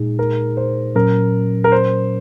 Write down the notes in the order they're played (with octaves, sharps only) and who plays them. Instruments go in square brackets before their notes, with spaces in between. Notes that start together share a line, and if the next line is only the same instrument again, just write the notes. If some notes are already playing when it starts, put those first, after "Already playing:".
Already playing: [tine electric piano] A#2 G#3 D#4 G#4
[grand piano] A#4
C5
[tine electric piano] A#2 F#3 C#4 [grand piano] A#4
[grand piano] A#4
C5